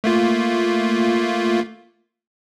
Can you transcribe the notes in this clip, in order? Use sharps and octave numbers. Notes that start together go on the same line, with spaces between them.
A3 A#3 F4